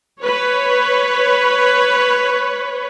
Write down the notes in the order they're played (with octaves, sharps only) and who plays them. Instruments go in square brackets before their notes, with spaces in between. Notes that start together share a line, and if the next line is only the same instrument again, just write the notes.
[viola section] B4 C#5